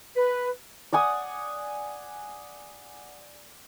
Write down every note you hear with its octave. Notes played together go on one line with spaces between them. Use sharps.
B4
D5 F#5 G#5 D#6